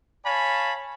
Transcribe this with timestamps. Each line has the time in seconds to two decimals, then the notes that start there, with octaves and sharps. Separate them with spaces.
0.24 C#5 F5 G#5 A5 B5